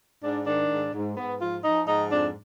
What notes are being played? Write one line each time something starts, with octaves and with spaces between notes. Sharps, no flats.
G#2 D4
D#3 D4
G#2
G#2
G#2 B3
F3 F4
F3 D#4
G#2 D#4
F2 D4